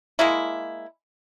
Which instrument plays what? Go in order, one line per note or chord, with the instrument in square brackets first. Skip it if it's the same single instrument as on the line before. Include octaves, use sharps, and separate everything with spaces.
[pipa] G#3 A#3 E4